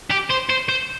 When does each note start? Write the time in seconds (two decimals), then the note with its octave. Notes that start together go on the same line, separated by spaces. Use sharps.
0.10 G4
0.30 C5
0.49 C5
0.69 C5